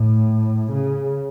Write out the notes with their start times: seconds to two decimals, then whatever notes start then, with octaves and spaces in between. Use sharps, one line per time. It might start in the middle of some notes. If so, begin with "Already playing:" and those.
Already playing: A2
0.74 C#3